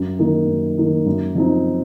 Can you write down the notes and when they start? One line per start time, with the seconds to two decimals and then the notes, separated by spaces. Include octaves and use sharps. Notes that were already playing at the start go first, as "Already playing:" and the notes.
Already playing: F#2
0.19 D#3 A#3 D#4
0.48 F#2
0.78 D#3 A#3 D#4
1.06 F#2
1.35 F3 C4 D#4